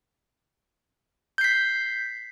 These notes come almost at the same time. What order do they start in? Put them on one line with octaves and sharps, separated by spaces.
G6 C7 B6